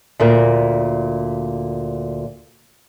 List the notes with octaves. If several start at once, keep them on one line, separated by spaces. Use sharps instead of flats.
D2 A#2 A#4